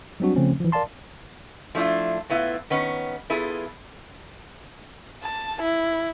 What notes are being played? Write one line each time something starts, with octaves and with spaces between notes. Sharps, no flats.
F#3 G3 C4 D4 F#4
C#3 F3 A3 C4 C#4
E3 F3
A#4 D5 F5 A5 C6
F3 A3 D4 E4 F4
A2 B3 E4 F4
D#3 B3 C#4
B3 E4 F4 G#4 A4
A5
E4